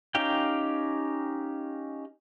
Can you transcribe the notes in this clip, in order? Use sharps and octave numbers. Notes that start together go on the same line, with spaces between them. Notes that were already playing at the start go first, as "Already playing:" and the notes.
C#4 D#4 G4 F5 G5